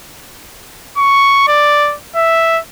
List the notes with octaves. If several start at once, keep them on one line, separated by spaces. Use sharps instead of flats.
C#6
D5
E5